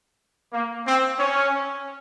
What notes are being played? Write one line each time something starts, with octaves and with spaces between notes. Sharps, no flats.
A#3
C4
C#4